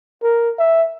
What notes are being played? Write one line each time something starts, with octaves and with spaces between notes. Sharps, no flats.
A#4
E5